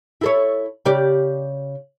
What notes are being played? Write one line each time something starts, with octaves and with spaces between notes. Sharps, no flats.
E4 A4 C#5
C#3 G4 D5